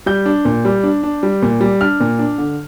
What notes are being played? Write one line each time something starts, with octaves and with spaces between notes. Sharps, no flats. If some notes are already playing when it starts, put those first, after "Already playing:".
G3 G6
D4
A#2
G3
D4
D4
G3
A#2
G3
D4 F6
A#2
D4
D3